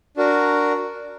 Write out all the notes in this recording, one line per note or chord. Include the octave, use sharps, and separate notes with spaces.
D4 F#4 A#4